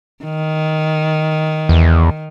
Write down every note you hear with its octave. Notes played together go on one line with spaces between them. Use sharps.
D#3
E2